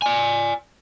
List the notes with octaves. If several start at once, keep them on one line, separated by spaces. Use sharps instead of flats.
D5 G#5